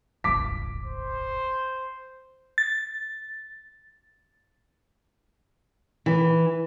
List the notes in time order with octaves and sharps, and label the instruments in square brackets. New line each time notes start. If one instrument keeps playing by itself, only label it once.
[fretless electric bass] D#1 G#1 C#2 [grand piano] D6 B6
[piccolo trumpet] C5
[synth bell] A6
[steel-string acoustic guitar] E3